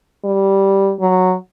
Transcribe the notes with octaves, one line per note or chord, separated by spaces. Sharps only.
G3
F#3